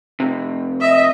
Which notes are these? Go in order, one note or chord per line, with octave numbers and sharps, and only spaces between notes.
F2 C3
D#5 E5